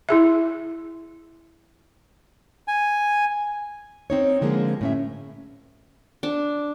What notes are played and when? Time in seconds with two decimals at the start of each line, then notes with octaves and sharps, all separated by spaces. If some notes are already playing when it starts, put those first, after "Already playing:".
0.09 E4 G#4 E5
2.68 G#5
4.10 C4 D#4 C#5
4.41 D3 F3 G#3 A#3 C4 G#4
4.81 A2 C#4 E5
6.23 D4